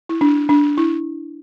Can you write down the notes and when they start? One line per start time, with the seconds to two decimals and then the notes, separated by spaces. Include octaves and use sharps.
0.09 E4
0.21 D4
0.49 D4
0.77 E4